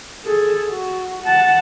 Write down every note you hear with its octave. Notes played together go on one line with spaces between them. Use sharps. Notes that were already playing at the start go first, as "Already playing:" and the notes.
G#4 A4
F#4
F#5 A5